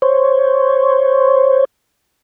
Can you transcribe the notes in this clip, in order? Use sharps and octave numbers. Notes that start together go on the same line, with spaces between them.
C5 C#5